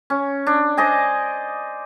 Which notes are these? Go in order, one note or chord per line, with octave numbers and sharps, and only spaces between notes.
C#4
D4
C5 D5 D#5 G#5